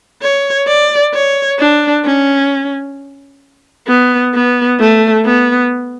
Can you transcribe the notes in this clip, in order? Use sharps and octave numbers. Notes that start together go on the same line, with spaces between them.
C#5
D5
C#5
D4
C#4
B3
B3
A3
B3